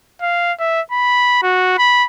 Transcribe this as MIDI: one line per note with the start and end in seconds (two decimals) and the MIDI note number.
0.22 0.53 77
0.59 0.81 76
0.91 1.42 83
1.43 1.77 66
1.78 2.06 83